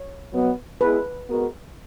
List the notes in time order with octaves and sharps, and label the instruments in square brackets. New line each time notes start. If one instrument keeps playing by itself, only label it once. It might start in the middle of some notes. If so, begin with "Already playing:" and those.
Already playing: [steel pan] C#5
[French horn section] B2 F#3 B3
[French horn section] G#3 B3 E4 G#4 [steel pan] B4
[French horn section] G#3 B3 F#4 A#4